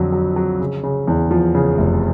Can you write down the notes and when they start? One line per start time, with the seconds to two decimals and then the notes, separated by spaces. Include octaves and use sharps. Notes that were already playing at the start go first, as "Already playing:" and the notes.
Already playing: F2 D3 F#3
0.12 F#3
0.36 F#3
0.60 C#3
0.83 C#3
1.07 E2
1.31 F3
1.55 C#3
1.78 F1